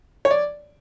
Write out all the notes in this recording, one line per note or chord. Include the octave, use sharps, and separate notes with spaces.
C#5
D5